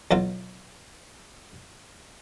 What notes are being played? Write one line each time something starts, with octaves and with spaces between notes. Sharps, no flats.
B1 B2 F#3 F4